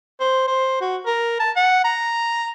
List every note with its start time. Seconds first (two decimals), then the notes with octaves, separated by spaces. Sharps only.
0.20 C5
0.48 C5
0.81 F#4
1.06 A#4
1.40 A5
1.56 F#5
1.84 A#5